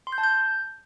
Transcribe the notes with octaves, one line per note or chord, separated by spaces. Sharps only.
C6
G6
A5
G6